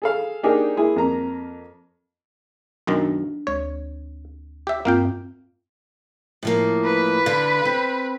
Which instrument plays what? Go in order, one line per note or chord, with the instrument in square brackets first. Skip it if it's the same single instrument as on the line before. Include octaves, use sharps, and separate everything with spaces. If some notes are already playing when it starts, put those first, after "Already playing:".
[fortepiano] G#4 A4 F5
A#3 D4 D#4 G4 G#4 A#4
G#3 A#3 E4 G#4
F2 A#3 A#5
[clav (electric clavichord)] B1 F#2 D#3 [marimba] D4
[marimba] D2 G#3 [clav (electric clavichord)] C#5
[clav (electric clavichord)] G4 E5
[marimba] G2 C4 F4 [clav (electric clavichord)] A#3 F5 G5
[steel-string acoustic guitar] A2 F3 A#3
[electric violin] B4
[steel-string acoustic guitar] D3 F5
C4